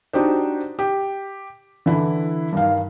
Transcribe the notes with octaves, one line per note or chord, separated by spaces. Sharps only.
D4 D#4 F#4 G4 C5
G4
D3 E3 E4
G2 D#3 F5